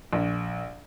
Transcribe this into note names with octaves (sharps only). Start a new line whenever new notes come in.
A#1